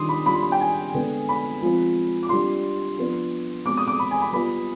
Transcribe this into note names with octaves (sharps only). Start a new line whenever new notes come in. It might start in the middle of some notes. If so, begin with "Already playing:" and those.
Already playing: D#3 G3 D4 F4 C6 D6 D#6
B5
G3 D4 F4 B5
C6
B5
G5
G#5
D3 G#3 B3
B5
F3 G#3 C4 F4
D6
G3 D4 F4 C6
F3 B3 D4
B2 G#3 C4 D6
D#6
D6
B5
G#5
B5
G3 B3 F4 B5